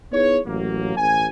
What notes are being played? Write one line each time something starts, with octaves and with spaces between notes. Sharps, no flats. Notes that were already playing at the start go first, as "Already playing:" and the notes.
B3 D#4 E4 G#4 C#5
A1 F#3 A#3
A1 G#5